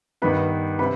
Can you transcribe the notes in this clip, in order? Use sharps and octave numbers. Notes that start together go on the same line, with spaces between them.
G2 D#3 B3 B4 B5
C3 B4 B5